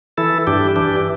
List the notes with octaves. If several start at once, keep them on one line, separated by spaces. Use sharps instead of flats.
E3 E4 A4
G2 D4 G4
E3 D4 G4